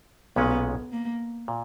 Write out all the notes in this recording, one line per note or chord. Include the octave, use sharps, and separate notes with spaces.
B1 A#2 G#3 B3 C#4
A#3
A#2